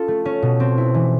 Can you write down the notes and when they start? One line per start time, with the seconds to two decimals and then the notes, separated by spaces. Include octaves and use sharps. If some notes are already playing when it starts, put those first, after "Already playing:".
Already playing: C#4 F4 A4
0.08 A3
0.25 C#4
0.43 B2
0.60 C4
0.78 E4
0.94 E3